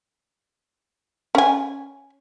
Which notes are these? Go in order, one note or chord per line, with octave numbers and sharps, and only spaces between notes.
C#4 G#5